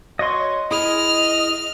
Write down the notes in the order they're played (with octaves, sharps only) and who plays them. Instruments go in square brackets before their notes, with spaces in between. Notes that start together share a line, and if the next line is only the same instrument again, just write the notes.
[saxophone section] F#4 C#5 [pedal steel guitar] D#5 C6
[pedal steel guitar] E4 G#4 [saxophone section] D#5 [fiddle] F6